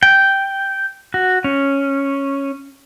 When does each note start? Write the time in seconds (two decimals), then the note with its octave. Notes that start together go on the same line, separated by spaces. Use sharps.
0.03 G5
1.14 F#4
1.44 C#4